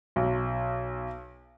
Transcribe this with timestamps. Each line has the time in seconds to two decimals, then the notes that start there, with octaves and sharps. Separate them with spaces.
0.16 B1